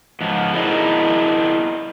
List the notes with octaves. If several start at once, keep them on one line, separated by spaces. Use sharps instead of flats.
G#2 F3
E4 G#4 A#4 D5 D#5